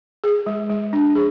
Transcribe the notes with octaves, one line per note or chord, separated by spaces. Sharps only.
G#4
G#3
G#3
D4
G#4